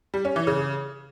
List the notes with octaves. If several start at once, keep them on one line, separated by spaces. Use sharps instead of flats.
G3
C#4
E3
C#3